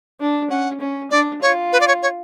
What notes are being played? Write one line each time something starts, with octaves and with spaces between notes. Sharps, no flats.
D4
C#4 F#5
C#4
D4 D5
F4 C#5
B4
D5
C#5
C#5